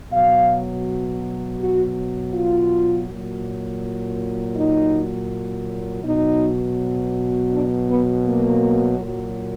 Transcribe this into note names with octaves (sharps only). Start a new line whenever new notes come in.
B2 F#3 F5
F#4
F4
A#2 F#3
D#4
B2 F#3 D#4
D4
B3
A#3
A#2 F#3